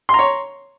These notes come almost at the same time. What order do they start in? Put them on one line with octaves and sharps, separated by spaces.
C6 A#5 C#5